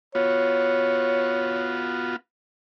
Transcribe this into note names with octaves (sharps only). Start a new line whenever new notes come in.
B3 F4 F#4 C#5